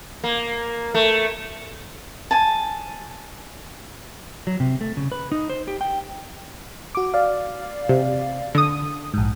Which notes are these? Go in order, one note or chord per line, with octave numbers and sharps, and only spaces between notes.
A#3
A3
G#5 A5
F#3
C3
A3
C#3
B4
D#4
C5
G4
G5
F#4 D6
D5 F5
C3
D3 D#6
A#1 G#2